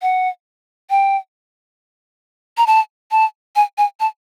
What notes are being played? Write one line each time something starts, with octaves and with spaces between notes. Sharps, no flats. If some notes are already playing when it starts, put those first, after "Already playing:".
F#5
G5
A#5
A5
A5
G#5
G#5
A5